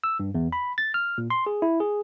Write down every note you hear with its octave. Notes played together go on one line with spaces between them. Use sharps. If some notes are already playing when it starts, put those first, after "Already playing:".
E6
G2
E2
B5
A6
F6
A#2
C6
G#4
E4
G#4